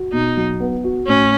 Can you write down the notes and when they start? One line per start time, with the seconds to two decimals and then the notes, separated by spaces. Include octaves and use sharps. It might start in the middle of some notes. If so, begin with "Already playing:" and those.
Already playing: F#4
0.13 B2 D#4
0.37 F#3
0.60 B3
0.84 F#4
1.07 A2 C#4